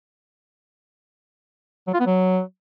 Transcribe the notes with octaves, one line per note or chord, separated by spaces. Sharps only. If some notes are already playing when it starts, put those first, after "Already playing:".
F#3
F4
B3
F#3